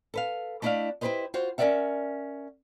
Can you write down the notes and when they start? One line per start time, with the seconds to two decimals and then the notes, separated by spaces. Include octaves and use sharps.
0.14 A4 B4 F5
0.62 A3 D4 E4 D5 D#5 F5
1.01 E4 G4 G#4 B4 C5 D#5
1.34 F4 F#4 C5
1.58 C#4 A#4 B4 D5 E5 F#5